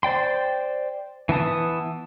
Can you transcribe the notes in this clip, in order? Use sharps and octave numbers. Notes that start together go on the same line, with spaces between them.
C5 D5 G5 C6
E3 B3 A5 D#6